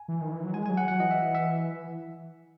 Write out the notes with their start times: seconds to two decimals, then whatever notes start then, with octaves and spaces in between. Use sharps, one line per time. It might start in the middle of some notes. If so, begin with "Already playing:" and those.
Already playing: G#5
0.08 E3
0.21 D#3
0.32 E3
0.43 F#3
0.54 G#3 G#5
0.66 G#5
0.69 F#3
0.77 F#5
0.88 F#3 F#5
1.00 E3 D#5
1.11 E5
1.35 E5